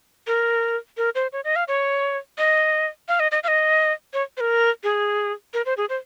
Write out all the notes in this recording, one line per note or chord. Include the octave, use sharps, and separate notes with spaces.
A#4
A#4
C5
C#5
D#5
F5
C#5
D#5
F5
D#5
D#5
F5
D#5
C#5
C5
A#4
G#4
A#4
C5
G#4
C5